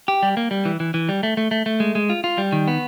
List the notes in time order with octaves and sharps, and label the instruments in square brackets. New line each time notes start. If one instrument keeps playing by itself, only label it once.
[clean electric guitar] G4
G3
A#3
G3
E3
E3
E3
G3
A3
A3
A3
A3
G#3
G#3
F4
F4
G3
D#3
B3